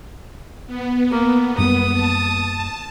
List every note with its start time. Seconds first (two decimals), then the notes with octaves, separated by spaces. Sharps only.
0.67 B3
1.11 A#3
1.58 F#2 G3 A#3 D#6
1.92 A5